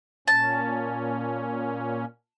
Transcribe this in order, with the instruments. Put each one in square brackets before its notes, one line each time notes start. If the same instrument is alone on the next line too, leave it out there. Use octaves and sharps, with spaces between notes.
[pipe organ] A#2 C#4 [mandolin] A5